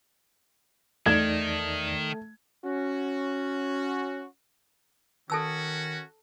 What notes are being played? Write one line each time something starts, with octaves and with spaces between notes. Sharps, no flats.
E2 D#3 A3 D#4 D5 G#6
C#4 F#4
D#3 C#4 F#4 A4 A5 E6